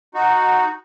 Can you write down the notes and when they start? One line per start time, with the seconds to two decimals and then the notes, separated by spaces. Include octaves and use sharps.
0.14 D#4 F#4